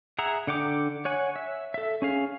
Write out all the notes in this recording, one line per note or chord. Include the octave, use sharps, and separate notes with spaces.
G#4 E5 F#5 A#5
D3 F#5 G5 D6
C#5 F#5 G#5
E5
A4 E5
C#4 G#4 F5